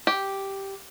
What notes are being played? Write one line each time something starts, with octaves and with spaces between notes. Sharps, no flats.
G4